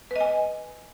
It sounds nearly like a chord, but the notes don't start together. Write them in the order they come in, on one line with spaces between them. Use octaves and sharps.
B4 D#5 G#5